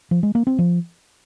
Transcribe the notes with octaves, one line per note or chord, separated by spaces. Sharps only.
F3
G#3
A#3
C4
F3